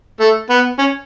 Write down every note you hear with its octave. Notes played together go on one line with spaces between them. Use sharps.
A3
B3
C#4